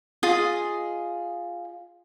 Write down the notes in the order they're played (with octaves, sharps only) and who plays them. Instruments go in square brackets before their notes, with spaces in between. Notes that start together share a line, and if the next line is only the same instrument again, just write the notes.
[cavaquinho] F4 G#4 D#5